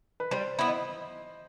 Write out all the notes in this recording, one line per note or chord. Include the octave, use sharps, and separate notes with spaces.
B4
G3 C5
B3 E4
D#5